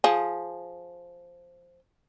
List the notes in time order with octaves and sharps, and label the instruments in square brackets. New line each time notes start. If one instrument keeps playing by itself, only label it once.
[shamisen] F3 G#4